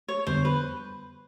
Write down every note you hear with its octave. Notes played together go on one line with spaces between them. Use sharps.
C#5
F2 D3 G3 B3 C5
B4